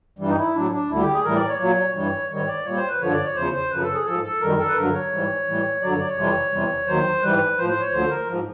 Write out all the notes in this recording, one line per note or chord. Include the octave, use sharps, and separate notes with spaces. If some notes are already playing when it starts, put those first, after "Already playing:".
G2 E3 G3
D#4
E4
A2 F#3 D4
D4
D2 D3 G3 E4
G4
G#4
A2 E3 G3 A#4
D5
C#5
A#2 F#3 C#5
G2 E3 G3 C#5
G#2 D#3 G3 C#5
D5
A#2 G3 C#5
C5
B4
G2 D3 F3 C#5
D5
C#5
E2 C#3 F3 C5
C5
F#2 C#3 F3 B4
A4
G#4
G#2 F3 A4
A4
F#2 D#3 G3 A#4
A4
B4
G2 D3 F#3 A#4
C#5
G#2 E3 G3
A2 E3 G3
G2 D3 F#3 D5
C#5
D5
C#5
F2 C3 E3 G3
E2 C3 E3 G3
D#2 D#3 F#3 C5
G#2 E3 G3 B4
A2 F3 C5
C5
C#5
D2 D3 F3 C5
A#4
G#2 F3